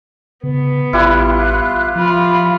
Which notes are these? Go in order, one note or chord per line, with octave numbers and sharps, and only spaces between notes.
C#3 B3
A1 G3 E4 F4 F#6
F3 F4 F5 B5